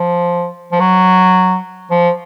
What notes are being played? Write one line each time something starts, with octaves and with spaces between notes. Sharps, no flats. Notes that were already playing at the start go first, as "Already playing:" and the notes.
Already playing: F3
F3
F#3
F3